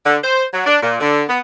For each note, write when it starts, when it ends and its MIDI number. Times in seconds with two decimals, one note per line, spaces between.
0.05 0.17 50
0.23 0.44 72
0.53 0.63 54
0.66 0.77 62
0.82 0.96 46
1.01 1.22 50
1.29 1.39 59